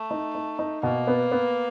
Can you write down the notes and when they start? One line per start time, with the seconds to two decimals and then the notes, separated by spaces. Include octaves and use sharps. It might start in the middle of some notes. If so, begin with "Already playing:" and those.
Already playing: A3
0.11 D#4
0.35 D#4
0.59 D#4
0.83 B2 A#3
1.07 B3
1.32 B3